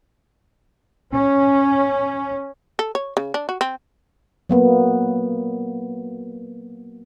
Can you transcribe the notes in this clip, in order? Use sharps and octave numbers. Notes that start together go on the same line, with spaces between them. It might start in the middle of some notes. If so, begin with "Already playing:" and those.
C#4
A4
C#5
C#3
D4
F#4
C4
F#3 A#3 B3